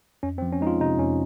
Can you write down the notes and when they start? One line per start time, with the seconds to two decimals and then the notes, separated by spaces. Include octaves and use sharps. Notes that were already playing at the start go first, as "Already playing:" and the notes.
0.23 F2 C#4
0.38 C4
0.42 F3
0.52 C#4
0.61 G#3 D#4
0.67 F4
0.80 C3 D#4
0.99 F2 C#4